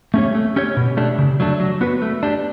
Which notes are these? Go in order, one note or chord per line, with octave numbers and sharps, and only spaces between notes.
A3 C#4 G4 C#5
A3
C#4 G4 C#5
B2
A3 D4 G4
C#3
F#3 A3 D4
F#3
B3 F#4 B4
A3
D4 G4